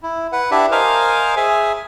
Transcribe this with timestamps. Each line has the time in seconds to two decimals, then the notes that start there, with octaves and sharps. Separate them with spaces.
0.03 E4
0.32 B4 F#5
0.51 D4 E4 G4 D5 E5
0.72 A#4 C5 D#5 F5 G#5
1.36 G#4 E5 G#5